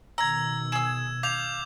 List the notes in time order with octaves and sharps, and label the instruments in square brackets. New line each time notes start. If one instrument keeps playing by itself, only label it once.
[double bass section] B2 D#3 [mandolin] A#5 [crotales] E6 G#6
[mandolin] G#4 E6 [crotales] E7
[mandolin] F5 [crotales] D6 G6 F7